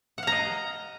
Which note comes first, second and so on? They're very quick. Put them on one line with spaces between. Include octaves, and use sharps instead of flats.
F#5 F5 A#5 D#5